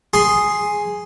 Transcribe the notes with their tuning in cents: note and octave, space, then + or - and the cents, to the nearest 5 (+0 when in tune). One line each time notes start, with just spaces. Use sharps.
G#4 +0 C6 +5